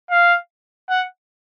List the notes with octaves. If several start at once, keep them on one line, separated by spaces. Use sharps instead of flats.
F5
F#5